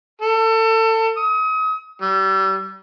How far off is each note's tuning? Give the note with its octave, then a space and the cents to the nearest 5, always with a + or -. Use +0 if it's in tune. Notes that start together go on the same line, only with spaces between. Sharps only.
A4 +30
D#6 +35
G3 -35